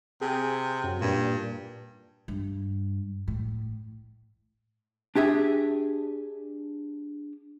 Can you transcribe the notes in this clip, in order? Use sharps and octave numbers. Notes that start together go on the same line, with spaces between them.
C3 G#4
F#2
G2 A#2
G2
A2
D4 G4 G#4 E5